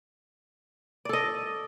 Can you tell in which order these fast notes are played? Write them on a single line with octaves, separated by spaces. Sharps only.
D5 A4 D#5